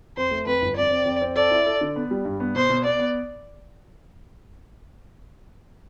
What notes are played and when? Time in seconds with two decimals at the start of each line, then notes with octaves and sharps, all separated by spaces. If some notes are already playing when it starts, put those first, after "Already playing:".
0.17 F2 C5
0.31 A3
0.46 F2 B4
0.62 G1
0.76 F2 D5
0.91 C4
1.05 F2
1.21 C4
1.36 A4 D5
1.51 E4
1.66 A4
1.81 D3
1.96 B3
2.11 G3
2.25 G2
2.40 B3
2.55 B2 C5
2.70 B2
2.84 B3 D5
2.99 B3